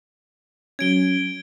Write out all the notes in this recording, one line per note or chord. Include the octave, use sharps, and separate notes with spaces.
F#3 C#4 G#6 D7 G7